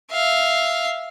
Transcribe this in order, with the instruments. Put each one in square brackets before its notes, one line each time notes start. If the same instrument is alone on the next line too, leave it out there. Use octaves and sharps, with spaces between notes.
[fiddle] E5 F5